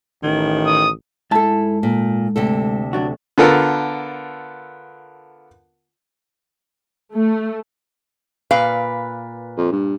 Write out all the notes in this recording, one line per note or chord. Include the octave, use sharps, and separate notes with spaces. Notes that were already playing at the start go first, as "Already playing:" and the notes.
A1 D#3
D#6
G#2 E4 A4 A5
A#2
D2 C3 A4
F#3 D4 F#4
D3 B3 F4 A4 A#4
A3
A#2 B4 F5
F2
G2